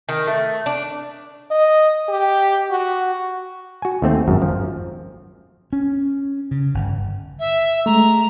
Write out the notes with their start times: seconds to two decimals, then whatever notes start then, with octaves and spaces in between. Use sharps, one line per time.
0.09 D#3
0.27 A3
0.66 D4
1.51 D#5
2.09 G4
2.71 F#4
3.82 F#4 G#5
4.02 D#2 A3 C4
4.28 G#1 F#2
4.42 F3
5.73 C#4
6.51 C#3
6.74 G1
7.40 E5
7.86 G#3 A3 A#5